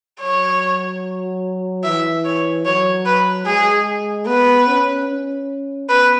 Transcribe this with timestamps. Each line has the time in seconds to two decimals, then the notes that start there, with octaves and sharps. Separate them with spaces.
0.21 F#3 C#5
1.84 E3 E5
2.25 C#5
2.65 F#3 C#5
3.06 B4
3.46 G#3 G#4
4.27 B3 B4
4.67 C#4
5.09 C#4
5.89 B3 B4